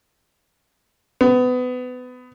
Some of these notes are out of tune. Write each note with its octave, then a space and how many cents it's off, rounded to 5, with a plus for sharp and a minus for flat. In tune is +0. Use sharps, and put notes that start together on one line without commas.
B3 +25